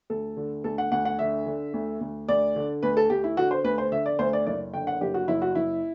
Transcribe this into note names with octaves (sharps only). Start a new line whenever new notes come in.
D2 A4
D3
D2 A4
F#5
D2 F#5
F#5
D3 E5
D3
D2
D2
D2 D5
D3
D2 B4
A4
D2 G4
E4
D3 F#4
C5
D2 B4
C5
D3 E5
D5
D2 C5
D5
F#1 D5
D3 G5
F#5
F#1 G4
F#4
F#1 E4
F#4
F#1 E4